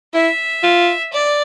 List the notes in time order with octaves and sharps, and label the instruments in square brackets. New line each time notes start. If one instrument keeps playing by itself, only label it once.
[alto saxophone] E4 [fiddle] E5
[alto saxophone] F4
[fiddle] D5